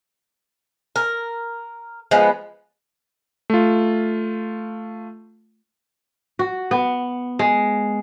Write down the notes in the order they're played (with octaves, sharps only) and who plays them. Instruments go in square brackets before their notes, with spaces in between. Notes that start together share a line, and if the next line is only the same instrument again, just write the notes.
[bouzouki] A#4
F3 G#3 B3
[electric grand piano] A3 F4
[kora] F#4
B3
G#3